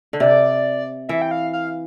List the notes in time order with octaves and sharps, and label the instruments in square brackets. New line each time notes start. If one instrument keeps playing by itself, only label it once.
[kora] D3
[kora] C3 [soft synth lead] D5
[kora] E3 [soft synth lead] E5
[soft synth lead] G5
F5
F5